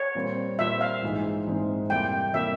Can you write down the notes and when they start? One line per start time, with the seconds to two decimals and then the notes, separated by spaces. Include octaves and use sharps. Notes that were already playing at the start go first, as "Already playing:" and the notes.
Already playing: C#5
0.15 A#2 G3 C4 F4
0.58 A#2 G3 C4 F4 E5
0.81 F5
1.02 A#1 G#2 E3 G#3 C4
1.46 A#1 G#2 E3 G#3 C4
1.90 F2 C3 G3 A#3 E4 G5
2.34 C3 G3 A#3 E4 E5